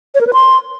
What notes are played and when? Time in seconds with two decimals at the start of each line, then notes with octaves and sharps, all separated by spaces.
0.15 C#5
0.21 A#4
0.27 B4
0.33 C6